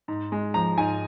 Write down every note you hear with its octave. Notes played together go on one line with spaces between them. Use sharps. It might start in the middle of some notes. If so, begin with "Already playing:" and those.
G#2
G#3
F3 A#5
G#2 G#5